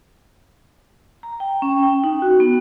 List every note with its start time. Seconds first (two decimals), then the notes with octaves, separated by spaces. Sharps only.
1.23 A#5
1.40 G5
1.62 C#4
1.83 G5
2.04 D#4
2.22 F#4
2.40 B3